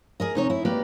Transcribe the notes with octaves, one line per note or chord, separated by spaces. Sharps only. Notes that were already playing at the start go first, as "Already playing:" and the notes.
G#4 A#4 D#5
C3 D#4 C#5
E4
A#3 G4 B4 D5